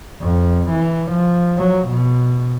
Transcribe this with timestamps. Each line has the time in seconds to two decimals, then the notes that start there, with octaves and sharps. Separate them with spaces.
0.22 F2
0.71 E3
1.11 F3
1.57 F#3
1.88 B2